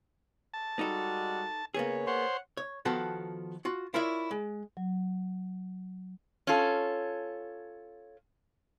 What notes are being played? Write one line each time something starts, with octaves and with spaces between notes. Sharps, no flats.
A5
G3 G#3 D#4 F#4 A4
C#3 A#3 B3 G#4 C#5
C5 C#5 F#5
C#5
D#3 F3 B3 F#4 A4
F4 F#4
E4 F4 A#4 C#5 D5 E5
G#3
F#3
C#4 F4 A4